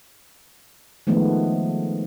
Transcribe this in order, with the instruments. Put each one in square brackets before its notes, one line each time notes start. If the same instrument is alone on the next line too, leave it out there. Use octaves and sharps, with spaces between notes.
[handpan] D#3 F3 G#3 A3 B3